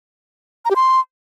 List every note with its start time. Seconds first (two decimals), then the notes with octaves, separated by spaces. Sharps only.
0.65 A#5
0.70 G4
0.76 C6